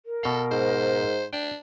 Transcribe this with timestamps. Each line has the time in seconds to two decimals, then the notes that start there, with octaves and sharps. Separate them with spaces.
0.06 A#4
0.23 B2 A4 F5
0.51 G#2 C5
1.33 D4 G5